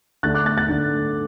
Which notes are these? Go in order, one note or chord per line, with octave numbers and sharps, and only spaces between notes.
D3 A3 D4 F#6 A6
D6 F#6
F#6 A6
F#6 A6
D3 A3 D4